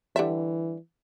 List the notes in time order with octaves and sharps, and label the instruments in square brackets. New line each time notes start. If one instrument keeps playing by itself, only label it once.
[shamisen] D3 G3 E5 [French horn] E3